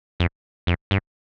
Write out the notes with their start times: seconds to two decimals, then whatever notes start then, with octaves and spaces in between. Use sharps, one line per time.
0.20 F2
0.67 F2
0.91 G2